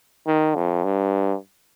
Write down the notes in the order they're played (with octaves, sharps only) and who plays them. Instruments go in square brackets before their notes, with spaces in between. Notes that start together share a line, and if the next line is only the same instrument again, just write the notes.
[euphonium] D#3
F2
G2